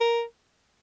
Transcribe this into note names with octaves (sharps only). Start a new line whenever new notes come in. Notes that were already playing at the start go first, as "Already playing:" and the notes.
A#4